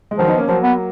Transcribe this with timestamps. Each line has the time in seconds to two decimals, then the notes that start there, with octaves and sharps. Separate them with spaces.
0.11 G#3
0.18 D#3 F3 F#3
0.28 B3 D#4
0.38 A#3 C#4
0.48 F3 F#3 A#3
0.63 B3